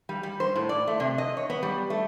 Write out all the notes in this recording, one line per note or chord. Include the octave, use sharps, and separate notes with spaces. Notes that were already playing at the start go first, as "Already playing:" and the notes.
G3
G3
C5
A2
D5
A3
C3
D#5
C#5
B3
G3
A3